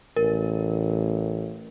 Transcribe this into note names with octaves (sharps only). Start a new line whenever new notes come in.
A1 A#4